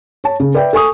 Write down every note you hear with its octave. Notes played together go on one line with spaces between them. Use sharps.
C#5 A5
C#3
B4 D5 E5 G5
A4 G#5 C#6 D#6